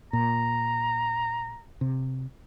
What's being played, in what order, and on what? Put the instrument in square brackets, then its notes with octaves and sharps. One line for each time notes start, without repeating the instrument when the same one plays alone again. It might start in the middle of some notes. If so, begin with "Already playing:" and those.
[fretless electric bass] A#2 [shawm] A#5
[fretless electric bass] C3